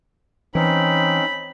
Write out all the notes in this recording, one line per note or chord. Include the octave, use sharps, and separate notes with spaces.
E3 C4 C#4 D#4 B5